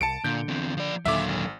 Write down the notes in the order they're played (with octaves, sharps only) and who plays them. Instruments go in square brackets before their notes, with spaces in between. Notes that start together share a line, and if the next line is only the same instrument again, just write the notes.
[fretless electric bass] C2 [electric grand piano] A5 C#7 D7
[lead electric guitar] A#2 [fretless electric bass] D3 [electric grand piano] G6
[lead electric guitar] E2 C4
F3 D5
[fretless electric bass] D#2 A#2 D3 [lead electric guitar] F#3 A4 [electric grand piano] E5 D6
[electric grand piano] G#1